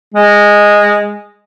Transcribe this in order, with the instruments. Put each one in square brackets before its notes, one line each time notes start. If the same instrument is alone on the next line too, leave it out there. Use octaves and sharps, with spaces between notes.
[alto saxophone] G#3